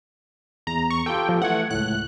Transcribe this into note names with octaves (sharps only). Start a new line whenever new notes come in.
E2 A#5
C#6
F4 G4 A4 G5
F3
E3 A3 F#5 G#6
C#2 A2 F#6